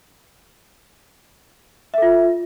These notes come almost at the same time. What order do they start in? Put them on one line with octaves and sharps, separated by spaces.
E5 A4 F4